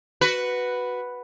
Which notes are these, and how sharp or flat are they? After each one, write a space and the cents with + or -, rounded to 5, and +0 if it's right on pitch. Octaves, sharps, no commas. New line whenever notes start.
F#4 +0 B4 +0